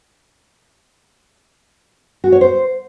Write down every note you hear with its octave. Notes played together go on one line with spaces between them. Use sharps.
F#4
C#5
C5